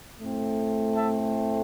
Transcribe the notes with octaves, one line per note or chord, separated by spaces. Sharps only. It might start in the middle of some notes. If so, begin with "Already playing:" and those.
A2 A3 C4
E5 A5